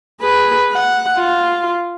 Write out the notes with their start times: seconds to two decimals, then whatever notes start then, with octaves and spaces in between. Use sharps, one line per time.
0.21 G#4 B4
0.72 F#5
1.16 F4